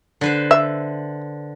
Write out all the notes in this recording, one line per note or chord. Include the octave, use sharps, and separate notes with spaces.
D3 B4 C5
E5